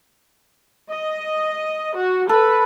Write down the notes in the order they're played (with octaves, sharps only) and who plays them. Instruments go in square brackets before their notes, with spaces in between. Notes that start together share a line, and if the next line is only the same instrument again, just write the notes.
[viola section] D#5
F#4
[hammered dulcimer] A4 [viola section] B4